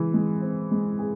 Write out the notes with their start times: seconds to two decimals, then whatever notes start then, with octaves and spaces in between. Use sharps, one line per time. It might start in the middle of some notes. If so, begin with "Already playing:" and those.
Already playing: E3 G#3 G#4
0.14 G#3
0.42 C4
0.71 G#3
0.99 G#4